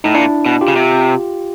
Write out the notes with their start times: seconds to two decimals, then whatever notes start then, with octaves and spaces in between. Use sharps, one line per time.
0.04 A2 D#4
0.14 A#2 D4 E4
0.46 B2
0.61 F4 G4
0.68 C#3
0.76 C3